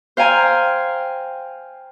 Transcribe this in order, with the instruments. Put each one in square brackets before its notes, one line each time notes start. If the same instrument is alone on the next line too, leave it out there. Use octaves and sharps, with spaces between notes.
[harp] C5 F5 G5 G#5 A#5